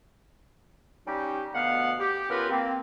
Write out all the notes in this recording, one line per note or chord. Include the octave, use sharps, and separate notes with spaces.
G3 C#4 D#4 G4
D2 B2 B3 F5 F#5
G4
C#3 B3 F4 G4 A#4 B4
A#3 C4